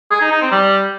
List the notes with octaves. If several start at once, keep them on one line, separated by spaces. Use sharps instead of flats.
G#4
D#4
D#4
C4
G3